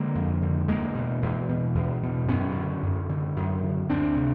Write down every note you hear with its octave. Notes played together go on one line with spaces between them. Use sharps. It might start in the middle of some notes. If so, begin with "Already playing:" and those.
Already playing: D3 G#3 A#3
F2
D3
E2 G#3 A#3
B2
E2
B2
E2
B2
F#2 B3 C#4
D3
F#2
D3
F#2
D3
D2 C4 D4
C3